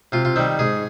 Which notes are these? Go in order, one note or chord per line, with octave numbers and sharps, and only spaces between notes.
C3 F4
F4
D#3 G3 C4
G#2 G#4